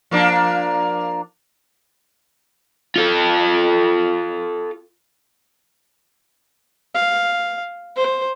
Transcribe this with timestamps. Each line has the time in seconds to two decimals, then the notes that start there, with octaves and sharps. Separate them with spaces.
0.11 F3 A#3 D4
2.96 F4 A4
6.95 F5
7.96 C5